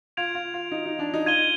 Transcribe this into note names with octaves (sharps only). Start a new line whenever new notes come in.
F4 G#6 D7 F7
F4
F4
D#4
D#4
D4
D#4
F4 G#6 D#7 G7